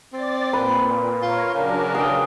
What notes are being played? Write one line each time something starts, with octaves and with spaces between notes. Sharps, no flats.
C4 D5 A6
A#2 B4
F4 A#4 C#5
C#3 F#3 D4 A#4
G#4 G5